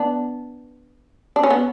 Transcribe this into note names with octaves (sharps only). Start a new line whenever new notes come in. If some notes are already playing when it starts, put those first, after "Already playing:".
Already playing: B3 D4
D4
C#4
B3